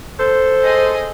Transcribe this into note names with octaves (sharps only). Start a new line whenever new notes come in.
A4 C5
G#4 D#5